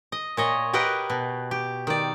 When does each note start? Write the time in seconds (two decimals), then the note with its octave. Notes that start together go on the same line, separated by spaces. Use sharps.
0.12 D#5
0.37 A#2 C#5 D#5
0.73 G4 A#4 B4 D#5 F#5
1.10 B2
1.51 G4
1.87 D#3 D5